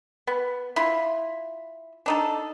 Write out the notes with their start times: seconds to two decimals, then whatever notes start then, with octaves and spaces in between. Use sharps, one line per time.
0.27 B3
0.76 E4 F4
2.06 D4 D#4 A4